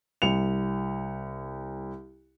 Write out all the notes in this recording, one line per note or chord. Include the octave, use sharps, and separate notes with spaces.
C2 C#7 F7